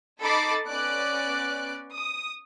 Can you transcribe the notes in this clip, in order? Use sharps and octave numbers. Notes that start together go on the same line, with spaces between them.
D#4 A4 B5 D6 A6 C7
B3 C#4 D5 F#6 D7
D#6